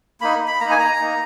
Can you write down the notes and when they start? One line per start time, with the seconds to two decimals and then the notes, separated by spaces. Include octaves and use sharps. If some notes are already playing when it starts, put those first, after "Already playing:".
0.21 A#3 D#4 B5
0.47 B5
0.61 A#3 D#4 A#5
0.70 G#5
0.80 A#5
1.00 A#3 D#4